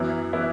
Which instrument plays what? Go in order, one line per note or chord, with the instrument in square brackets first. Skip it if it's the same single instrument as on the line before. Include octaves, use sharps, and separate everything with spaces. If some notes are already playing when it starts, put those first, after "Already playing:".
Already playing: [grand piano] F#2 E3 B3 E4
E3 B3 E4